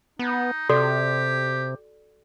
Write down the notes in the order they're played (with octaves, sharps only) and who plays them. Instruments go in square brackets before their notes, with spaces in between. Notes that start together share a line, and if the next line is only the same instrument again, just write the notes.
[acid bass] B3 [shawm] D#4
[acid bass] C3 [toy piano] F#4 A4 D5 [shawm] G4